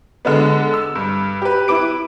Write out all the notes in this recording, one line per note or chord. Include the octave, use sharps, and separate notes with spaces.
D3 G#3 B3
E6
G2
G4 B4
E4 B4 D6 D7